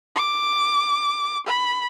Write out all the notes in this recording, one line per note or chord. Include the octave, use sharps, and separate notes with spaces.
D6
B5